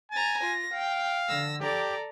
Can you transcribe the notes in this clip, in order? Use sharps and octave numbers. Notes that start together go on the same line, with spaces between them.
G#5 A#5 A6
F4 A#6
F5 G5
D3 E6 A#6
G4 A4 D5 A#5